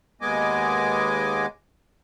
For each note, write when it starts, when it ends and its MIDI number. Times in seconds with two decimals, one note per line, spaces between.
0.21 1.46 39
0.21 1.46 56
0.21 1.46 59
0.21 1.46 75
0.21 1.46 80
0.21 1.46 86